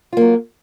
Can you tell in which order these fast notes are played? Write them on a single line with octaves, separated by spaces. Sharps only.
F4 A#3 F#3